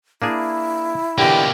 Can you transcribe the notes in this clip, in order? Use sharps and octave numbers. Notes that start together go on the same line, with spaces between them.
A#3 D4 E4 G#4
B2 D3 E3 A#3 G4